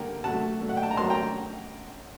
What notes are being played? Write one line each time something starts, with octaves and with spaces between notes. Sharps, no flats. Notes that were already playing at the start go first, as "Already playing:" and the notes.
Already playing: D3 G3 A#3 G5 A#5
C3 F#3 A3 F#5 A5
A#2 F#3 A3
F#5
G5
A5
A#5
A2 F#3 A#3 A5 C6
G5 A#5